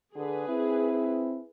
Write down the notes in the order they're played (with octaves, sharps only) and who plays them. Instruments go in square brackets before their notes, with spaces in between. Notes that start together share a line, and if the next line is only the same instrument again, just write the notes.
[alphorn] D3 [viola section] G#4 B4
[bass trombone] C4 [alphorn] E4